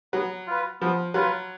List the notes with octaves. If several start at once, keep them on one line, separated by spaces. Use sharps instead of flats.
F#3 B3
F4 B4
F3 B3
F#3 F4 B4